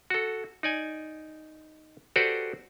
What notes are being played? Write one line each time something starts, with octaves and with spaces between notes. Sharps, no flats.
F#4 A4
D#4 D5 G#5
F#4 G4 A4 B4 C5 D5